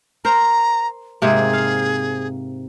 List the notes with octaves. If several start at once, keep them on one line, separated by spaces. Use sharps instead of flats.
A#4 C5 A#5
G#2 C3 A#3 G#4
F5